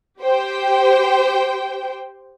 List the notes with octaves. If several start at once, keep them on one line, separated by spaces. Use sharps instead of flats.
G4 C5 G5